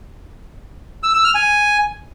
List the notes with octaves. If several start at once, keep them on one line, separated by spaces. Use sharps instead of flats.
E6
E6
F6
G#5